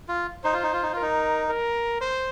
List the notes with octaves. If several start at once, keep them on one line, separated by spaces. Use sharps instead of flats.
F4
D#4 C5
F4
D#4
F4
D#4
F4 A#4
D#4
A#4
C5